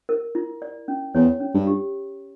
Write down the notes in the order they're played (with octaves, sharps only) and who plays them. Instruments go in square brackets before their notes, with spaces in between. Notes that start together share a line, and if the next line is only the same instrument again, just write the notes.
[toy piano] A#4
E4
D5
C#4
[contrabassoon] E2 [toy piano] C#5
[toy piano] C#4
[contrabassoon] G2
[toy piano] G4